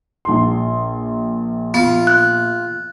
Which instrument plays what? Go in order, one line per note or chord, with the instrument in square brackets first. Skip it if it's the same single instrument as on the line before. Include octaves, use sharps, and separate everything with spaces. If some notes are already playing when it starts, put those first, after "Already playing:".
[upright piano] A#1 C6
[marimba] B3 [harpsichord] F4
[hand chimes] F#6